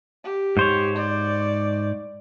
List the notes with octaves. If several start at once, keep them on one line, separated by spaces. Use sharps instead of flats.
G4
G#2 C5 C#5
D5